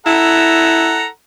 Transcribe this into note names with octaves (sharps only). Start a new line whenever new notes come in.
E4 A4 F#5 A#5